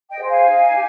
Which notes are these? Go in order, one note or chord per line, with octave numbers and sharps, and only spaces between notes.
D#5 G5
G#4 C5
F5 G#5
D#4
G4